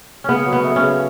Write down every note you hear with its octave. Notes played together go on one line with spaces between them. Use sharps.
C#3 B3 C#4
F#3
B3
A3
C#4
C#3